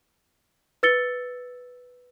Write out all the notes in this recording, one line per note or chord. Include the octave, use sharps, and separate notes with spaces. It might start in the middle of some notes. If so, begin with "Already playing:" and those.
B4 E6 A6 C#7 G7